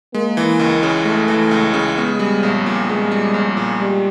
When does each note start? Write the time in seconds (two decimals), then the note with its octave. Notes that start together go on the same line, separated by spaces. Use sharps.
0.14 G#3 A#3
0.37 E3
0.60 C#2
0.83 C#3
1.05 G#3 A3
1.28 E3
1.51 C#2
1.74 C#3
1.97 G#3 B3
2.19 G3
2.43 A#1
2.66 A#2
2.89 G#3 B3
3.12 G3
3.34 A#1
3.57 A#2
3.80 G3 G#3